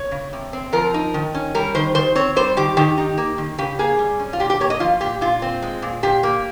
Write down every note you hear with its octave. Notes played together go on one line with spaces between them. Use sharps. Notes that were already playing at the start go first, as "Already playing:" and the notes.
Already playing: C#5
C#3
C3
C4
F3 A#4
D#4
D#3
C#4
G3 A#4
D#3 C5
D#3 C5
C4 C#5
G3 C5
D#3 G4
D#3 G4
D#4
A#3
D#3
C#3 G4
A#3 G#4
G3
C#4
F4
A#2 G4
G4
A#3 C#5
D#5
F3 F4
A#2 G4
A#2 F4
C4
G#3
A#2
A#2 G4
A#3